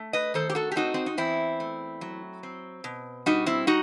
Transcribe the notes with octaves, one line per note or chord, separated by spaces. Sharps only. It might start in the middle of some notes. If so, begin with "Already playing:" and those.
Already playing: A3
B4 D#5
D#3 A4 C5
G4
F#4 A4
G4
C4 D#4 F#4
C4
D#4
E2 C4 E4
A3
F#3
C4
B2
G3 D#4 F#4
C4 E4
D#4 F#4